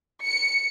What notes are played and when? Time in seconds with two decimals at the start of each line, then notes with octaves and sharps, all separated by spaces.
0.24 C#7